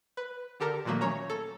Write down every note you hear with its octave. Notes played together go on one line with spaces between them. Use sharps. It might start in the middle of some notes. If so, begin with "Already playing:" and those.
B4
D3 G4 A4 A#4
A#2 D#3 F3 F#3 A3 A#3
C#4 C#5 A#5
A4